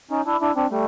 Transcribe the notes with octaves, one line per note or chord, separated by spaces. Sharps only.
C#4 D#4
D4 E4
D4 E4
C4 D4
G3 A3